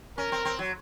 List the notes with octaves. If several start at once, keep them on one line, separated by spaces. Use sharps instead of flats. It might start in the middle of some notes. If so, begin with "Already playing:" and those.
C#4 A#4
C4
C4
F#3